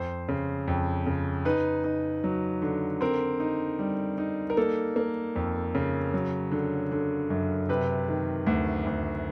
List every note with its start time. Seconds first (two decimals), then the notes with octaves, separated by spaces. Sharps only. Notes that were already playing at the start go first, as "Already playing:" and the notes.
Already playing: F2 C5
0.29 C#3
0.68 F2
1.06 C#3
1.45 D#4 B4
1.84 D#4
2.24 F#3
2.62 D3
3.01 C4 A#4
3.40 D#4
3.79 G3
4.18 D#4
4.50 A#4
4.57 A#3 A4
4.96 A#3
5.36 F2
5.75 C#3
6.14 F#3
6.52 D3
6.92 D3
7.30 F#2
7.69 C3 B4
8.09 D#3
8.46 D2
8.87 D2